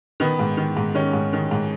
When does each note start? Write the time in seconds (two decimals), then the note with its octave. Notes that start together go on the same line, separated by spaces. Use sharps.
0.20 D#3 B3
0.39 G#2
0.57 D#3
0.77 G#2
0.94 D#3 C#4
1.13 G#2
1.33 D#3
1.51 G#2